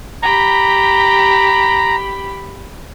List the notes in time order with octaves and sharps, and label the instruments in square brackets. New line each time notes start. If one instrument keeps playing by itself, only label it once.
[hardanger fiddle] G4 B5 [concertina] A#5